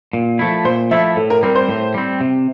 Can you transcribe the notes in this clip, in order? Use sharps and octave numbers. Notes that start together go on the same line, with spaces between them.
A#2
F3 A3 E4
A#2 C5
F3 A3 E4 E5
A2 A4
A#4
G3 C4 A#4
C5
A2
G3 C4
C3